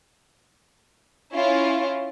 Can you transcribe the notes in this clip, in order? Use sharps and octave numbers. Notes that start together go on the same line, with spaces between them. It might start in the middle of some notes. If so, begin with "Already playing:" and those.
C#4 E4 F4